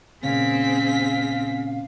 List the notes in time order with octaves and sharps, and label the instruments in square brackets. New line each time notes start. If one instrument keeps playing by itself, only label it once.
[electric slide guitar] A#2 C#3 C#4 [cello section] C4 [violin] G#4 B6 [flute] F5